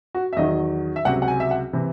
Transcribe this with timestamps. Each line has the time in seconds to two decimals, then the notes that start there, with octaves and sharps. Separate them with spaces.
0.15 F#4
0.33 E5
0.37 E2 D#3 F#3 D#5
0.96 E5
1.05 C#2 C3 F#3 F#5
1.22 F#5
1.28 G#5
1.40 E5
1.51 F#5
1.73 C3 E3